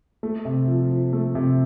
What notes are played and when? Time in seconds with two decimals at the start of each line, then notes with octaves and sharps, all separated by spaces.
0.23 A3
0.45 C3
0.68 F3
0.90 F3
1.13 A3
1.35 C3